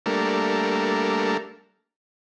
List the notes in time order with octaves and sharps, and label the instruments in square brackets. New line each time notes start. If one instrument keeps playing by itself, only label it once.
[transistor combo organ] G3 A3 A#3 D4 A4 A#4